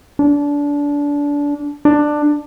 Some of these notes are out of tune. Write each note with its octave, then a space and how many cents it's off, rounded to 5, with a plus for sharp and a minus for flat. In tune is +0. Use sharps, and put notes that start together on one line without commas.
D4 -25
D4 +15